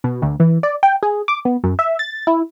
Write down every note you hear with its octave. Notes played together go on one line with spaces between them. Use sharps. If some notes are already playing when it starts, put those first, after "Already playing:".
B2
D2
E3
D5
G5
G#4
D6
B3
F#2
E5
A6
E4